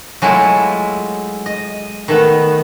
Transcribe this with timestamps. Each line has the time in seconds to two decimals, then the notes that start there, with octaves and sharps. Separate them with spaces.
0.22 F#3 G#3 A3 E4 F4
1.46 D#5
2.08 D#3 A3 B3